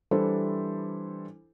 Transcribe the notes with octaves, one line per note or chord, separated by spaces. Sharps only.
E3 G3 D4 E4 A4 C5